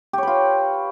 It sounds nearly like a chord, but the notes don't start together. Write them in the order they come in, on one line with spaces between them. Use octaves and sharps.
G4 C#5 B4 F4